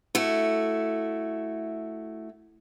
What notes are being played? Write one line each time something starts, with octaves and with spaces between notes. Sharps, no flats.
A3 E4 F#4